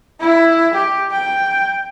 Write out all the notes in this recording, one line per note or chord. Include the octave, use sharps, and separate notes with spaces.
E4
G4
G5